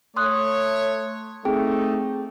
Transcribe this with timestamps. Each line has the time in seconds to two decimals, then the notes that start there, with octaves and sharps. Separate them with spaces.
0.16 A3 C#5 C6 D#6 F#6
1.45 A3 C4 D#4 G#4 G5